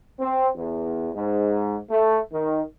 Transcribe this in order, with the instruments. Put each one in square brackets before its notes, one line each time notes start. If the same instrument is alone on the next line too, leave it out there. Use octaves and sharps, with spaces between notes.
[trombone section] C4
E2
G#2
A3
D#3